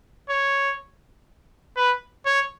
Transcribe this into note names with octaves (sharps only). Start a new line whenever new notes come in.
C#5
B4
C#5